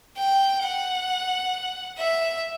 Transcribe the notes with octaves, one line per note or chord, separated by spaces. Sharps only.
G5
F#5
E5